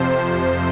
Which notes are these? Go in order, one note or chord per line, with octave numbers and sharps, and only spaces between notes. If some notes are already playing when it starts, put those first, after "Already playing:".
Already playing: F2 C3 F3 C5